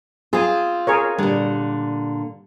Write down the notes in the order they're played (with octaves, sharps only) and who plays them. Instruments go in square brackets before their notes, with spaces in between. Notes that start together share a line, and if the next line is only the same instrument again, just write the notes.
[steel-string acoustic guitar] C4 F4 [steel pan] G#4
[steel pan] G#4 A#4 C#5
[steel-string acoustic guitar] A#2 D3 [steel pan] G3